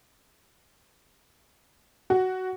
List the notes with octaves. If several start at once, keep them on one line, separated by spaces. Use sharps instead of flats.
F#4